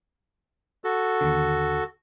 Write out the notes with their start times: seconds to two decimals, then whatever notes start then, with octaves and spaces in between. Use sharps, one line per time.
0.84 F#4 A4
1.21 D#2 D3